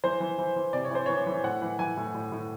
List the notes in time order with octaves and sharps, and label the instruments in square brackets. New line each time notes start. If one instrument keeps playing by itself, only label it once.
[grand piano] E3 C5
E3
E3
E3
C3 D5
C#5
E3 C5
E3 C#5
E3
A2 F#5
E3
E3 G#5
A2
A2
A2